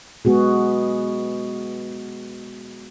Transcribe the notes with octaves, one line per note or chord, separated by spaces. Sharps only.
G#3 B3 F#4 G#4